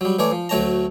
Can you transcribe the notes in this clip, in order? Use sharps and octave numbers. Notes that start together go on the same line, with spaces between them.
F#3 G3
E3 A3 C#5 D5
F3
D2 F#3 A3 C#5 A5 A#5